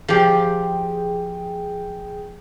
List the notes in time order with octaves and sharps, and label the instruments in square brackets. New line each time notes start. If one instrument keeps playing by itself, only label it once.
[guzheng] F3 G4 [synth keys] G#4 G5